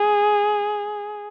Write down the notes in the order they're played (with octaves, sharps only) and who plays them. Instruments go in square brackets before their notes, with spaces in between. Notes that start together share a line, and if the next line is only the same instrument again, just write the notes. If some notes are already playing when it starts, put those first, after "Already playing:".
Already playing: [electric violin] G#4